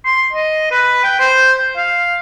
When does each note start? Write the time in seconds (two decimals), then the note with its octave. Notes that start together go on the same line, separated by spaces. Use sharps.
0.05 C6
0.33 D#5
0.71 B4
1.04 G5
1.20 C5
1.77 F5